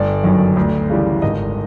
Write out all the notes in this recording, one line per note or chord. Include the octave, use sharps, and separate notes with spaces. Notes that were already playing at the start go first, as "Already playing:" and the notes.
Already playing: G1 D5
F#2 D#3 F#3
D2
C#3 E3 G3
G#1 D#5